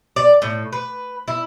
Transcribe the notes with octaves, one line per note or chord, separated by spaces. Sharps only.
D5
A2
B4
E4